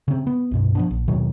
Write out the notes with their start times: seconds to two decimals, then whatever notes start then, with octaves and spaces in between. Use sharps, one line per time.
0.08 C#3 C4
0.27 B3
0.51 C2 G2 B2
0.75 F3 B3 D4
0.91 A#1
1.08 D#2 B2 D#3 F#3